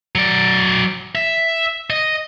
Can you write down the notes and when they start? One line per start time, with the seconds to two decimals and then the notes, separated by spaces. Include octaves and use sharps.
0.15 F#3 D5
1.15 E5
1.90 D#5